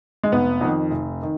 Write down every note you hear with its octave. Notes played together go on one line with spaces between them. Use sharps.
G#3
F1 B3
F2 D#3
F1
D#3